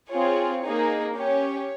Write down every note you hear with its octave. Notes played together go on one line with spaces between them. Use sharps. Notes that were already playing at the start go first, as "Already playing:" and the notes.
C4 F4 G#4 C#5
A#3 D#4 G#4
C#4 G4 C#5